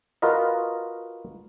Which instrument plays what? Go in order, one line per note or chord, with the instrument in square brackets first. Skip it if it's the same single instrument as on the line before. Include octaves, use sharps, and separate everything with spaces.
[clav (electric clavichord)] F4 F#4 A#4 B4 D#5